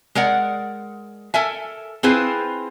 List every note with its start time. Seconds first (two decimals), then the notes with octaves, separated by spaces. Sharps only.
0.15 G#3 A#4 D5 F#5
1.34 A4 A#4 E5 G#5
2.03 C4 E4 F4 G#4 B4 C5